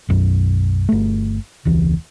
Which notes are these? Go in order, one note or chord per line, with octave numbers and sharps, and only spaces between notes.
B1 F#2
G1 A3
E1 C#2 E3